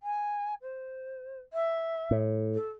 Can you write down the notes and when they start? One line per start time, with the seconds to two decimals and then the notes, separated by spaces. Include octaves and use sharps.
0.02 G#5
0.61 C5
1.53 E5
2.11 A2
2.54 A4